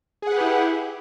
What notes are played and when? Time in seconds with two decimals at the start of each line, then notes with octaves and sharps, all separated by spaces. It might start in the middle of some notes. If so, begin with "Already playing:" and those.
0.22 G#4
0.27 F#5
0.32 B4
0.36 G4
0.41 E4